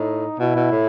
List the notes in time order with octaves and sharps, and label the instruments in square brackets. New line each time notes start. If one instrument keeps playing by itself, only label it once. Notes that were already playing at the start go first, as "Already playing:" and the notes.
Already playing: [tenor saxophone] A2 [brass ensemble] D#4
[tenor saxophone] B2 [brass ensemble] E4
[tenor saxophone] B2
A2